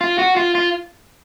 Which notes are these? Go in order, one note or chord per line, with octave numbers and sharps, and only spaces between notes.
F4
F#4
F4
F4